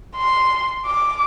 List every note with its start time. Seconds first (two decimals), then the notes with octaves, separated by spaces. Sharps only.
0.17 C6
0.86 D6